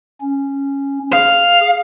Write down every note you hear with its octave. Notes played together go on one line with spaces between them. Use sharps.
C#4
G#4 F5